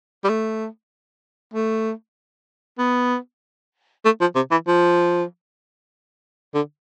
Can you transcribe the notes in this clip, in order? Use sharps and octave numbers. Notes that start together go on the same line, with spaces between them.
G3
A3
A3
B3
A3
F3
C3
E3
F3
D3